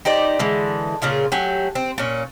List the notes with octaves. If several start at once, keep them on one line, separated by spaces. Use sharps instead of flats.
D#4 G4 C5 D5
D3 E3 G#3
A#2 C#3 F4 G#4
F#3 A3 G4 G#5
C4
A#2 C#4